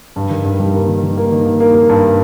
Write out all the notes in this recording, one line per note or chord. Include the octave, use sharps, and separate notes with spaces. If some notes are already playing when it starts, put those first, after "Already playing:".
G2
D#3
G2
G3
A#3
D#3
D#3
A#3
D#3
A#3
A#3
A#3
G2